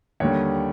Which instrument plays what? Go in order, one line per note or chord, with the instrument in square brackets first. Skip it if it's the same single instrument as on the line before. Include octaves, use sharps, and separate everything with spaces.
[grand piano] D#2 D3 G3 C#5